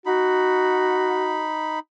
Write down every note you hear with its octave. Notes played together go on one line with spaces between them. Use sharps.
D#4 F#4 B5